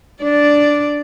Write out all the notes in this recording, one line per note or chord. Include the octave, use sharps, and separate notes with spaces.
D4 D5